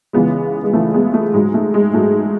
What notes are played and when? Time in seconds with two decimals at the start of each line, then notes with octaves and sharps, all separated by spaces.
0.13 C#2 C#3 E3 G#3 B3
0.64 G#3
0.73 C#2 C#3 E3 A3
0.93 G#3 B3
1.14 A3
1.33 G#2 F#3 G#3
1.54 A3
1.74 G#3
1.93 G#2 F#3 A3